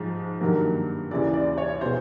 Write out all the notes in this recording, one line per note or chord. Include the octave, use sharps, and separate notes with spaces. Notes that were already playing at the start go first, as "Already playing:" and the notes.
Already playing: G#2 F3 G#3
G2 D#3 F#3 A#3
D#2 C#3 E3 D5
D5
C#5
B2 G#3 C5